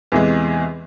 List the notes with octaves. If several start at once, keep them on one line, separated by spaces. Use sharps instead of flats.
E2 C3 E3 G#3